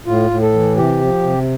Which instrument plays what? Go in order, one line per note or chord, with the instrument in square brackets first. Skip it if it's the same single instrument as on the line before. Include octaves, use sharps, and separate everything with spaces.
[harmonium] A2 F4
A2
A4
E3
C3 G4
F3
C3